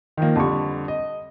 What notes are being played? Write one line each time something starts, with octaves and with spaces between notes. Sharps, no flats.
D#3 F3 A#3
F2 D3 G3 C#6
D#5